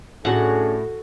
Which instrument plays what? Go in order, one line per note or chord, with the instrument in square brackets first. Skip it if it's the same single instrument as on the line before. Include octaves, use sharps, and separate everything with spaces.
[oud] A2 [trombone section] C#4 D4 G#4 [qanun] F#4 F#5